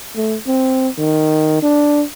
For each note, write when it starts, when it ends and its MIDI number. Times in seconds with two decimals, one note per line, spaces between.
0.16 0.36 57
0.47 0.88 60
0.98 1.60 51
1.62 2.04 62